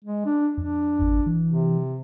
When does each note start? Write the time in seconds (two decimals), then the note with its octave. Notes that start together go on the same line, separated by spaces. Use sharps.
0.04 G#3
0.25 D4
0.57 F2 D4
1.01 G#1
1.26 E3
1.46 C3